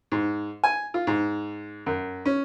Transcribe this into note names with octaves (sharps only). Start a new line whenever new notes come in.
G#2
G#5
F4
G#2
F#2
C#4